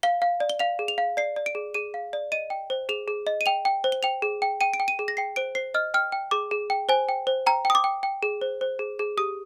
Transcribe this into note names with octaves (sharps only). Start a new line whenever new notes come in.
F5 G7
F5
D5
G7
F5 F7
G#4
F7
F5
D5 C7
D5
D7
G#4
G#4 D#7
F5
D5
D#5 D#7
G5
C5
G#4 F7
G#4
D#5
D#7
G5 F7
G5
C5
G7
G5 F7
G#4
G5
G5 D#7
D7
G5
D#7
G#4
A#6
G5 C7
C5 D7
C5 C7
D#5 F6
G5 F6
G5
G#4 D6
G#4
G5
C5 G#5
G5
C5
G5 A#5
G5
D#6
D6
G5
G5
G#4
C5
C5
G#4
G#4
G4 D#6